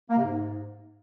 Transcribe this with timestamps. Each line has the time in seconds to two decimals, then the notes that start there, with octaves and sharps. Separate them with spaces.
0.10 A#3
0.17 C3
0.24 G#2